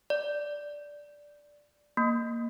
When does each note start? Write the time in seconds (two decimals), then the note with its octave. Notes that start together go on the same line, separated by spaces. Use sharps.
0.10 D5
1.97 A#3